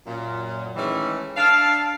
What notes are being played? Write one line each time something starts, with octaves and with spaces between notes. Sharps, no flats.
F#2 A#2
D#3 E3 G#3 A3 C#4
D4 A4 F5